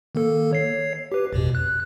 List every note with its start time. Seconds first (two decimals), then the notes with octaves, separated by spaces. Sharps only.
0.15 D#3 A#3 A4
0.53 C#5 C7
1.12 G4 B4
1.33 A1 F2 B2
1.55 F#6